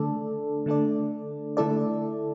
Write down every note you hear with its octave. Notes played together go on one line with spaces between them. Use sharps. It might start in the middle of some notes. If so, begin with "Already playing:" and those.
Already playing: D3 A3 D4 A4 D5
D3 A3 D4 A4 D5
D3 A3 E4 A4 D5